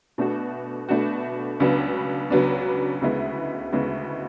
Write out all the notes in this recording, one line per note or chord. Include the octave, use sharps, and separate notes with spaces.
B2 A3 D4 F#4
B2 A3 D4 F#4
C#2 C#3 F#3 B3 D4
C#2 C#3 F#3 B3 D4
D2 C#3 G#3 B3 E4
D2 C#3 G#3 B3 E4